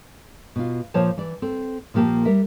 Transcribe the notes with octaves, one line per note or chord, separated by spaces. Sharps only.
B2 F4
A#2 F3 C5 C#5 A5
E3 D5
C4 A4
A#2 F3 A#3 G4 A5
G3 A#4 E5